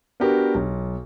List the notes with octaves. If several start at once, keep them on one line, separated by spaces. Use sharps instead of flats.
B3 D4 F#4 G4 A#4
B1